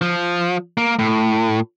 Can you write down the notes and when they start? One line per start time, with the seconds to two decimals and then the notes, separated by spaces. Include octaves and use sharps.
0.01 F3
0.77 A#3
0.99 A2